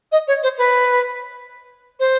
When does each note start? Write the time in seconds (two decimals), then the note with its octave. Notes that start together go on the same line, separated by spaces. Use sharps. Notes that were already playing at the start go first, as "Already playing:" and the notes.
0.12 D#5
0.28 C#5
0.43 C5
0.58 B4
2.00 C5